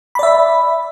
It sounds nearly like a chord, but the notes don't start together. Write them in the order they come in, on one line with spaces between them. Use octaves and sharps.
B5 D5 E5